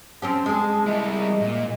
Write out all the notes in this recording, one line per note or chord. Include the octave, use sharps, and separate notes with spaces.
C4 C#4 G4 A5
G#3 G#4
G3 E4 D#5
A#2